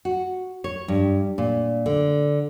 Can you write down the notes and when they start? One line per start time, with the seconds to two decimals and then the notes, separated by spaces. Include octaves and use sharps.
0.05 F#4
0.64 C#5
0.88 G2
1.38 A#2
1.86 D3